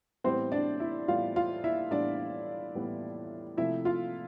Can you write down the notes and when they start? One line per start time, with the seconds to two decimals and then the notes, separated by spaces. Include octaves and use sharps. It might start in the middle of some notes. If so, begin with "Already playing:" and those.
0.24 A2 E3 G3 B3 C4 C5
0.52 D4 D5
0.80 E4 E5
1.08 A2 E3 G3 B3 F4 F5
1.36 F4 F5
1.64 E4 E5
1.91 A2 E3 G3 B3 D4 D5
2.75 A2 E3 G3 B3
3.57 C3 F3 A3 E4 E5
3.85 F4 F5